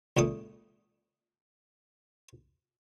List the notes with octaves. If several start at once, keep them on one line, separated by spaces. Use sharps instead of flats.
C#2 A#2 A3 D#6